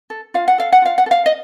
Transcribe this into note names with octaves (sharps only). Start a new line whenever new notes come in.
A4
F4 F5
F#5
A4 F5
F#5
F4 F5
F#5
A4
F5
D#5